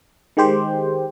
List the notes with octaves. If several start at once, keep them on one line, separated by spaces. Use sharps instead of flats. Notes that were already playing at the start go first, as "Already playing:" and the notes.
D#3 G#3 G4 C5